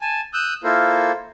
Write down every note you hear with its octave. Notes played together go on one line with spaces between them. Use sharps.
G#5 A5
D#6 E6 F#6 G6
A#3 E4 F4 A4 A#4 C5